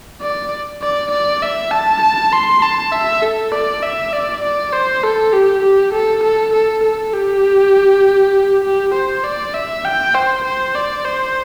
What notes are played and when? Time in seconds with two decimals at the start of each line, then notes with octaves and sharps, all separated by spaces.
0.22 D5
0.82 D5
1.12 D5
1.42 E5
1.72 A5
2.02 A5
2.33 C6
2.62 A5
2.92 E5
3.22 A4
3.52 D5
3.82 E5
4.13 D5
4.43 D5
4.73 C5
5.03 A4
5.33 G4
5.63 G4
5.93 A4
6.24 A4
6.53 A4
6.83 A4
7.13 G4
8.64 G4
8.94 C5
9.24 D5
9.54 E5
9.85 G5
10.14 C5
10.44 C5
10.75 D5
11.05 C5